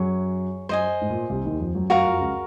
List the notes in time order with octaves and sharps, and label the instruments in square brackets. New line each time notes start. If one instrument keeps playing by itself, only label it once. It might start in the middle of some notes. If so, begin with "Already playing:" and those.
Already playing: [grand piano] F#2 F#3 [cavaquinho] G#4 C#5
[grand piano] F#2 F#3 [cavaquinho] C5 D#5 G#5
[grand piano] G#2
A#2
C2 C3
D#2 D#3
F2 F3
F#2 F#3
[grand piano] F#2 F#3 [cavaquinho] F#4 A#4 F5 A#5
[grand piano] F2 F3
C#2 C#3